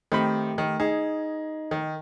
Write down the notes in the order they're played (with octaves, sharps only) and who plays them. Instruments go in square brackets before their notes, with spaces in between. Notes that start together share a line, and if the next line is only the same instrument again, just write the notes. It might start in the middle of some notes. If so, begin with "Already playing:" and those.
[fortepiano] D#3 C4 B5 [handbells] A3 G4
[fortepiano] D#3
[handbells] D#4 D#5 [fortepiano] G#4
[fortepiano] D#3